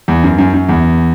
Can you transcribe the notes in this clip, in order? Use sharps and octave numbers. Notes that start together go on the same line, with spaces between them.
E2
F#2
F#2
F#2
E2